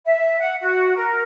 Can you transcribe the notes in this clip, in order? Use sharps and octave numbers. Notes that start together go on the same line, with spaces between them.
E5
F#5
F#4
A#4